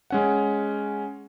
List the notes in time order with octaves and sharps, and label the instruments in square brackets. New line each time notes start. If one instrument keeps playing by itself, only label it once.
[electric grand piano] G#3 C#4 F#5